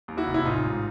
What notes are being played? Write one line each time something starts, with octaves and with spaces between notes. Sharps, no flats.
D#2
E4 F#4
F1
E4
A1 D#4 F4
G#2